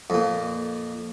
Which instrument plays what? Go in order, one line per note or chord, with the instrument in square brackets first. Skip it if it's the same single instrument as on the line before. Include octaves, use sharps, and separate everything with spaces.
[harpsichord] F2 A#2